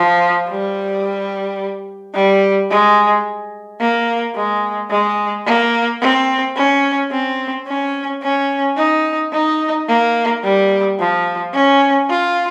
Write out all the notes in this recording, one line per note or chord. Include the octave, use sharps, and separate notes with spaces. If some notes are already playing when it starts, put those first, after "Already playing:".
Already playing: F3
G3
G3
G#3
A#3
G#3
G#3
A#3
C4
C#4
C4
C#4
C#4
D#4
D#4
A#3
G3
F3
C#4
F4